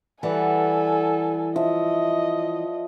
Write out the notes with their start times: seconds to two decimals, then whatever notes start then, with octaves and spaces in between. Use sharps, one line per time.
0.23 E3 G3 A4 D5 F#5 G#5
1.56 F3 D#5 E5